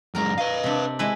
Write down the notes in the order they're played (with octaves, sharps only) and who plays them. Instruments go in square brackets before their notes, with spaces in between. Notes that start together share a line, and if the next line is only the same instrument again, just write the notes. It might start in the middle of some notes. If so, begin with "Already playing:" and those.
[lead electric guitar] F#2 G#3 [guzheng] A#4 A#5
[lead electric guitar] B4 F5 [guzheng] D#5
[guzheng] C3 D4
G#3 E4 B4